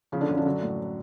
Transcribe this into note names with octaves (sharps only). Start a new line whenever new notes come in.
C#3 F3 C#4
D3 D4
F#2 C#3 C#4
D3 D4
F#3
A2